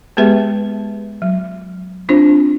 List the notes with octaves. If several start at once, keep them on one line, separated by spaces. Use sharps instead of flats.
G#3 B3 G4 G#4 B4 E5
F#3
C4 D4 F4 C5